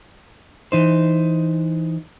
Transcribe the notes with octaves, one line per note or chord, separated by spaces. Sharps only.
E3 D#4 C5